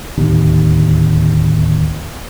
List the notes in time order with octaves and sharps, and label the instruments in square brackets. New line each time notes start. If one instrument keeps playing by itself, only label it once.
[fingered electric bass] D1 D#2